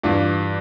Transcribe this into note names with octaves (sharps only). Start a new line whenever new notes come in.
G2 E3 F4